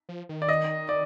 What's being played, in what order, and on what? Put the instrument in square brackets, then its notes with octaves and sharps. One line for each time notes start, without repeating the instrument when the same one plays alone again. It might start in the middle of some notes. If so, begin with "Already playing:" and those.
[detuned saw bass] F3
D#3
[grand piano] D5
D#5
D5